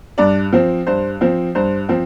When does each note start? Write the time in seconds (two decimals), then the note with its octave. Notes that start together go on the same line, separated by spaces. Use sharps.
0.18 G2 D5
0.52 F3 C4
0.87 G2 C5
1.21 F3 C4
1.55 G2 C5
1.89 F3 C4